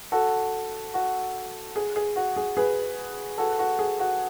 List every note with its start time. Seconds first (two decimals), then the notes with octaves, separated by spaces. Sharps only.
0.12 F#4 A4
0.94 F#4
1.76 G#4
1.96 G#4
2.16 F#4
2.37 G#4
2.57 G#4 B4
3.38 F#4 A4
3.59 F#4
3.79 G#4
3.99 F#4